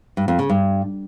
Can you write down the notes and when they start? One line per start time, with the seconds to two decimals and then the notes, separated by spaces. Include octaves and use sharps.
0.17 G2
0.28 F2
0.39 C#3
0.50 G2